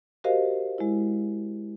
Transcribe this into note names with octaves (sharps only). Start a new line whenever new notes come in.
F#4 G4 A#4 C5 D#5 F5
G#3 E4